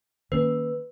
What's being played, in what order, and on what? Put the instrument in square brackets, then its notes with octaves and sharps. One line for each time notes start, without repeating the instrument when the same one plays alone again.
[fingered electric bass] D#3 A#3 C#4 [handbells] B4